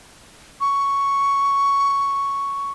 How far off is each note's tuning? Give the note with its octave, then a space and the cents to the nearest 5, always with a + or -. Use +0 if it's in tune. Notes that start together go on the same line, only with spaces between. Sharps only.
C#6 +5